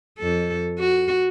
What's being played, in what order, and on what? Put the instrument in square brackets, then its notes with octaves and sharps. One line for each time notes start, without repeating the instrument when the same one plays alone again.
[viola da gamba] F2 A4
F#4